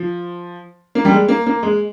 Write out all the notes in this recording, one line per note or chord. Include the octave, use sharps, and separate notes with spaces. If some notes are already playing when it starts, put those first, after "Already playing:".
Already playing: F3
A#3
G3
G#3
A#3
A#3
G#3